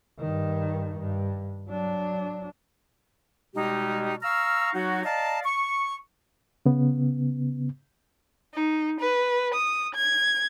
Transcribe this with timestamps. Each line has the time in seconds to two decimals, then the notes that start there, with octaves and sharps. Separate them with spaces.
0.19 G2 D#3
0.99 G2
1.69 F#3 D4
3.55 B2 G3 G#3 D#4 G4
4.22 F5 A#5 C#6 E6 F6
4.74 F#3 D#4 F#4
5.04 D5 D#5 F5 A5 A#5
5.44 C#6
6.66 C#3 B3
8.54 D#4
9.01 B4
9.54 D#6
9.95 G#6